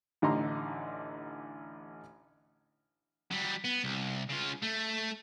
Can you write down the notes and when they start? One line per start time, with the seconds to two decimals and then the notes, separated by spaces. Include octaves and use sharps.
0.22 A1 D3 D#4 A#5 C6
3.31 F#3 G3
3.64 B3
3.84 C2
4.30 C#3 F4
4.63 A3